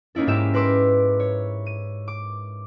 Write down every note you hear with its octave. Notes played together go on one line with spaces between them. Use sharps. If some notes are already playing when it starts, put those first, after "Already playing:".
A#3 C#4 D#4 E4 A4
G#2 G#3 E4 G4 E5 E7
A#4 B4 C6 D6 E6
C#5
D#7
D6